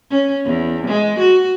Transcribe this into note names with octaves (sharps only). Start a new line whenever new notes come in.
C#4
E2
G#3
F#4